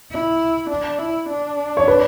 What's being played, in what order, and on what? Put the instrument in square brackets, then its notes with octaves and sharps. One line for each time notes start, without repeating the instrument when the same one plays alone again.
[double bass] E4
D4
E4
D4
[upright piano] C#5
B4